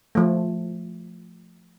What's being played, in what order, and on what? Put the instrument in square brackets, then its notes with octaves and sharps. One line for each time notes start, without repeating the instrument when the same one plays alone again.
[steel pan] F3 A3